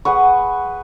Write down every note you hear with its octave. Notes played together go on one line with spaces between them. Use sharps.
G#4 B4 F#5 C#6